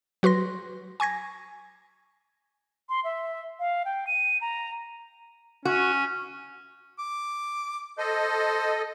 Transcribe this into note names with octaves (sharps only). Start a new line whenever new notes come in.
F#3 F#4 B4 C6 A#6
G#5 C#6 G#6 A#6
C6
E5
F5
G5
D#7
A#5
C#4 F#4
D6
A4 C5 D#5